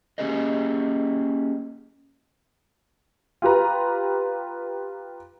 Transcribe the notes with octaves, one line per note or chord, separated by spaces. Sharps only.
A#3 C#4 G4 G#4 A#4 D#5
F4 G4 B4 A#5